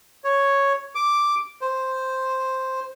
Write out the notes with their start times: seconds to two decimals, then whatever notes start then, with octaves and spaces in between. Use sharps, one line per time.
0.24 C#5
0.95 D6
1.61 C5